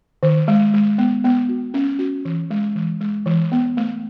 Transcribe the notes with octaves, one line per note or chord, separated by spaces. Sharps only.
D#3
G#3
G#3
B3
B3
F#4
C#4
F#4
E3
G#3
E3
G#3
E3
B3
A3